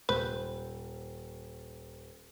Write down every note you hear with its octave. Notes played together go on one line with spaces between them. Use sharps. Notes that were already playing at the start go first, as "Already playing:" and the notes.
D#1 B4 C5